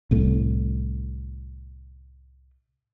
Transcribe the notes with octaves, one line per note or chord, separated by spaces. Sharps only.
C2 A2 A3